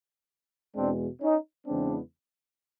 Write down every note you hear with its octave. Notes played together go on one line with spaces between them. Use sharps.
E2 B2 G#3 C4 D4
C#4 D#4
E2 C#3 E3 G#3 B3 C4 D4